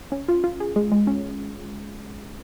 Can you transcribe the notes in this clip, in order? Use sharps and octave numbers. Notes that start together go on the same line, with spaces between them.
C#4
F4
F4
G#4
G#3
G#3
C#4